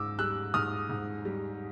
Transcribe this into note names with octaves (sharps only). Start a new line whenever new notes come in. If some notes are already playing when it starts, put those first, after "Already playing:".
Already playing: G#2 D6 E6
G3 E6 F#6
G#2 D#6 F6
G#2
G3